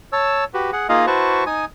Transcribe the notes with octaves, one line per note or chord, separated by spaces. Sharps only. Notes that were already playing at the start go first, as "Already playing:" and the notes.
C#5 A5 E6
F#4 G4 B4
G#4 F#5
A#3 D#4 F4 G#4 D#5 F5
E4 F#4 B4 C5 A5 C#6
D#4 G#5 D#6